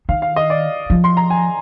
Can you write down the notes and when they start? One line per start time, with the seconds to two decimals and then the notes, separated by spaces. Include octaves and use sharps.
0.09 D#3 F5
0.22 F5
0.36 D#5
0.50 D5
0.90 F3
1.04 C6
1.17 A#5
1.30 G#5